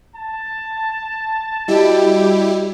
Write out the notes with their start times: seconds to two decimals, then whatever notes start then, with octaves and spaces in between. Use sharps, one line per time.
0.16 A5
1.68 G3 E4 F#4 G4 D#5